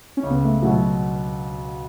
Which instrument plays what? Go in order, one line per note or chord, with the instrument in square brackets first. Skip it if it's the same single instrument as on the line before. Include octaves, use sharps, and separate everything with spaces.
[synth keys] C#4
[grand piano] C#2
[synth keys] B3
A3
[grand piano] B2 F#3 [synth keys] A3